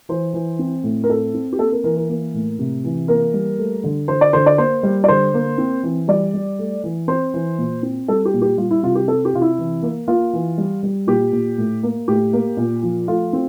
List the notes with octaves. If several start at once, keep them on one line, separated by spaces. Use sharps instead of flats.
E3 C5
E3
C4
A2
A#4
C4 A4
C4
G4
A#3 A4
A#4
E3 A#4
A#4
A#3
A2
C3
E3
A#3 A#4
G3
A3
D3
D3 C5
D5
D3 C5
D5
A#3 C5
G3
D5
D3 C5
A#3
C4
E3
G3 D5
G3
A3
E3
C4 C5
E3
A#2
C4
G3 A4
G4
A#2
G4
G3 F4
E4
C3 F4
G4
C4 A4
G4
C3 F4
E4
E3
A#3
A#3 F4
E3
G3
G3
A#2 G4
A#2
A2
A#3
A2 G4
A#3
A#2
F3
A3 F4
C4